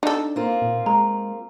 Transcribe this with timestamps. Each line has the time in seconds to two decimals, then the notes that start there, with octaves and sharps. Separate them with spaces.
0.03 D4 D#4 A4
0.36 A#3 C4 F4
0.62 A#2
0.86 G#3 A#5